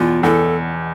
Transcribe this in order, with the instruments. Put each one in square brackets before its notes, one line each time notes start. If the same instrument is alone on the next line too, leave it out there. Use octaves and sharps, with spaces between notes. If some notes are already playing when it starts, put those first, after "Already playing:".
Already playing: [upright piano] E2 B2 [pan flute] F4
[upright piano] E2 [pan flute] A4